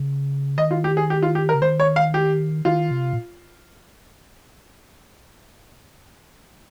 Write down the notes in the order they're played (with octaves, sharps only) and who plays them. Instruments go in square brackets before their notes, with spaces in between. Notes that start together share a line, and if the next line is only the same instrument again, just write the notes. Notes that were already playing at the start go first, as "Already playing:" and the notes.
Already playing: [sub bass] C#3
[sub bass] D#3 [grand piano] D#5
[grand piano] F4
G4
G#4
G4
F4
G4
A#4
[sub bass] C#3
[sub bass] D#3 [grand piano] C5
[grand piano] C#5
F5
G4
[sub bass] D#3 [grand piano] F4
[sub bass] C3
A#2